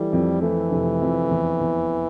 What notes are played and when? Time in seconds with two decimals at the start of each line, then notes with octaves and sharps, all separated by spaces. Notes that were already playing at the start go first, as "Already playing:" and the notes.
Already playing: E3 G3 A3
0.13 F2
0.42 E3 A3
0.71 F1
1.01 F2
1.30 E2
1.60 E2